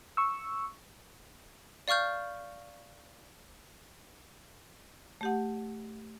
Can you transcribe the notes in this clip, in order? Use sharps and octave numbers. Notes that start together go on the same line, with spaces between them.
C#6 E6
D5 F5 C#6 F6 G6
A3 G4 F#5